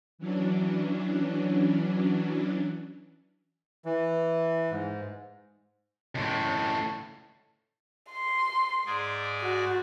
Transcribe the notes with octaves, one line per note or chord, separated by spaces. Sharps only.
E3 F#3 C#4 D4
E3
G#2
C#2 A2
C6
G#2 G#4 D5
F#4